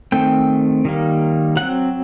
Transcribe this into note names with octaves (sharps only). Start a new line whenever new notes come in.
D#3 A3 C4 G5
D#3 G3 A#3
F#3 C4 F#5